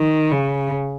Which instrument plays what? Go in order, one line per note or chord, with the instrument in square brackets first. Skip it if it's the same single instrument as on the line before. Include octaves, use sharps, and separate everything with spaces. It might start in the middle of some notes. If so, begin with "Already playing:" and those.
Already playing: [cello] D#3
C#3